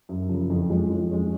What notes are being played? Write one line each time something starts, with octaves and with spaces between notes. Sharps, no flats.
F#2
C#3 F3
F2
F3 G#3 C#4
F2
F3 G#3 C#4